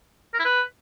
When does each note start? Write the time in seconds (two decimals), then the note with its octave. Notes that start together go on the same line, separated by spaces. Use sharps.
0.34 A#4
0.39 E4
0.45 B4